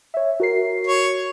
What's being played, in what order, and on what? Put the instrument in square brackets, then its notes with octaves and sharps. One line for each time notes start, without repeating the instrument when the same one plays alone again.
[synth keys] C#5 E5
F#4 A#4 C7
[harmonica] C#5